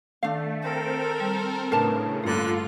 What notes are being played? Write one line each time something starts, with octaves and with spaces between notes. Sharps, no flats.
D#3 A3 D4 F5
C4 A4 A#4
G3
A2 C#3 A3 D4 A#4 B4 A5
G2 D3 A3 A#3 F4 F#6